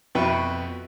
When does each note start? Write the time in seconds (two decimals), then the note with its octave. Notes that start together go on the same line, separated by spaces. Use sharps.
0.15 F2 B2 B4 E5 G5 C#6